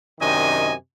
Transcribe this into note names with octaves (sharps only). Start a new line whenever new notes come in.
F#2 C3 D#3 D4 D#5 G#5